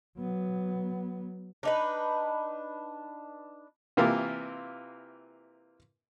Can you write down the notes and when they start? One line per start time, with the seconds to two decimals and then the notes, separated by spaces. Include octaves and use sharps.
0.18 F#3 B3
1.63 D4 D#4 B4
3.97 C3 E3 A#3 F4